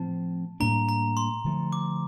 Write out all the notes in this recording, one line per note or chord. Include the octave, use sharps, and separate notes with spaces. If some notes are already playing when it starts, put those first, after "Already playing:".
Already playing: A2 F3 C4 A5
A2 G3 A#3 D4 A#5
A#5
C6
D3 F3 A3
D6